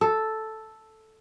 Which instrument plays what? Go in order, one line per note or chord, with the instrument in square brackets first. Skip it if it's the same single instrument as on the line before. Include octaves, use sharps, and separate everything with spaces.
[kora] A4